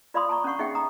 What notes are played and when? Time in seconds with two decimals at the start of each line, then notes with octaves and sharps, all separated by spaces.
0.14 F4 D5 F5 B5 C6 D#6
0.29 A5 A#5 C#6
0.44 C#4 D4 F#5 C#6
0.59 D#4 G#4 E5 F#5 G5
0.75 A#5 D#6